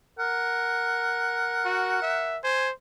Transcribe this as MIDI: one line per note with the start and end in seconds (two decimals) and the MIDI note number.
0.19 2.51 70
0.19 2.38 78
1.65 2.02 66
2.02 2.38 76
2.44 2.72 72
2.44 2.67 80